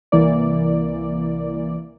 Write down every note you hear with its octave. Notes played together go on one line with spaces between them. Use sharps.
C2 E3 A#3 D5